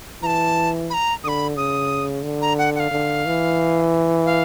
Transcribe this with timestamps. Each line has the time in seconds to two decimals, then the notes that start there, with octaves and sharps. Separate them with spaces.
0.23 E3 A5 A#5
0.90 B5
0.94 A#5
1.24 D3 B5 D#6
1.57 C#3 D#6
2.24 D3
2.42 A#5
2.58 F#5
2.75 F#5
2.80 F5
2.91 D3
3.26 E3
4.26 F5